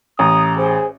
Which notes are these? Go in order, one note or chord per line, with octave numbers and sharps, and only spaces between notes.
A1 A#5 D#6
G#4 C5